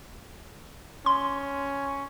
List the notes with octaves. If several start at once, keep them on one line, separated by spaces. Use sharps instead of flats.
C#4 C6